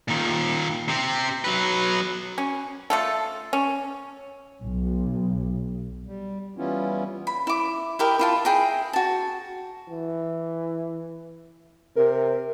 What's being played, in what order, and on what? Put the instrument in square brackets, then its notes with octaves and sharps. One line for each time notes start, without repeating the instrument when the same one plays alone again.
[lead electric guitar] A#2 D#3
C3 C4
F#3 B4
[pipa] C#4
A3 F4 A4
C#4
[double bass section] B1
[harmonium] G3
E3 G3 B3 C#4 E4 F4
[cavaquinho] B5
E4 D6
E4 G4 A#4 D#5
E4 F4 A5
E4 G#4 G5 A#5
F#4 A5
[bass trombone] E3
[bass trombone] C3 [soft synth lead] A#4